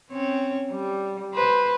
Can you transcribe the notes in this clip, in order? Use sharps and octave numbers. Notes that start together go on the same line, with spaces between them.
C4 C#4 C#5
G3
B4 C5